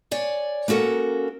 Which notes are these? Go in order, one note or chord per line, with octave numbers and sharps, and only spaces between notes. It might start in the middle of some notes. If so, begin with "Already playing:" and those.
C#5 D5 G#5
A#3 C#4 F#4 A4 A#4